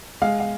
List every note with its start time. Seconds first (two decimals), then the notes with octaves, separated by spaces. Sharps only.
0.22 G#3 F5
0.40 F5